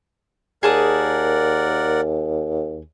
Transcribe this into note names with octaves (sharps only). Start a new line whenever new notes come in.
D#2 G#4 A#4 D5 F#5 A5 D#6